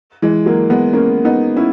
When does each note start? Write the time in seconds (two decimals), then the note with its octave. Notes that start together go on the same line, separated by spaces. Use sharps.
0.22 E3 G#3
0.46 F#3 A#3
0.70 G#3 B3
0.93 A#3 C#4
1.25 B3 D#4
1.56 C#4 E4